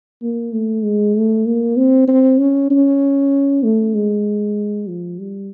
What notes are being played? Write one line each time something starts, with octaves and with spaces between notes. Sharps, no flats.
A#3
A3
G#3
A3
A#3
C4
C4
C#4
C#4
A3
G#3
F3
G3